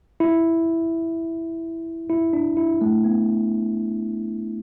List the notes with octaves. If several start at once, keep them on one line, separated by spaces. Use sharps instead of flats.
E4
E4
D4
E4
A3
B3